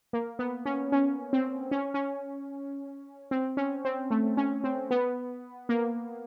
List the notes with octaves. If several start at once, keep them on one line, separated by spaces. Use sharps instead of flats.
A#3
B3
C#4
C#4
C4
C#4
C#4
C4
C#4
C4
A3
C#4
C4
B3
A#3